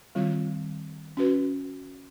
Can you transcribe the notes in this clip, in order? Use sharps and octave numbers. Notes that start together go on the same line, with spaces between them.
D#3 G3 C4 F4
C#4 F#4 B4